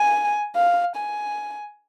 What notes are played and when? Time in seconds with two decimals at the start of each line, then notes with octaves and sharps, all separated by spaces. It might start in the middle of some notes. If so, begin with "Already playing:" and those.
Already playing: G#5
0.55 F5
0.96 G#5